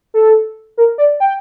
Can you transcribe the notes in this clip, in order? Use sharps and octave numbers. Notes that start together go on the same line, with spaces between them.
A4
A#4
D5
G5